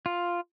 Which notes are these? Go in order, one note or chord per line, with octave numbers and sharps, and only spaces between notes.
F4